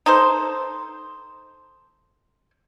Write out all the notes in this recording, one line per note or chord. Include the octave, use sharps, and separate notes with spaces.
D#4 A4 C5